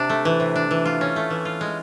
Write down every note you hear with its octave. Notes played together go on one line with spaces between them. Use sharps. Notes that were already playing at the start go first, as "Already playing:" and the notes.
Already playing: C3 D4
A3
E3
C3
D4
E3
F4
C#4
A3
E3
F4
G#3